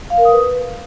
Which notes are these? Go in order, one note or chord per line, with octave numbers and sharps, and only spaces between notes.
F5
A#4
D#6
B4